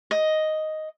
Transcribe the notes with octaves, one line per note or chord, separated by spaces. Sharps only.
D#5